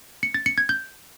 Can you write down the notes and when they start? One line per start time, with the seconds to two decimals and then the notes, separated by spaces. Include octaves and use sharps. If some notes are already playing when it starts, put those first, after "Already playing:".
0.23 C#7
0.34 A6
0.46 C#7
0.58 G#6
0.69 G6